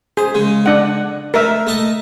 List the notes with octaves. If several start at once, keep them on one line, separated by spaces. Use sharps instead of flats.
G#4 C5
C#3 G#3
D4 F#5
A3 A#4 E5
A3 D#5 A5